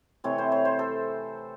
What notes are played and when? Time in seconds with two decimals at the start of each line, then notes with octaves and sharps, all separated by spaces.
0.24 C3 E3 A3 C4 C#5
0.38 C5
0.52 C#5
0.65 C5
0.79 A4